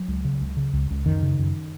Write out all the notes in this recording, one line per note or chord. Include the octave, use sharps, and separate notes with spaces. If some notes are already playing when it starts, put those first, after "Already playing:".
Already playing: F#3
C#2
C#3
C#2
C#3
C#2
C#2
F#2 D#3
C#3
F#2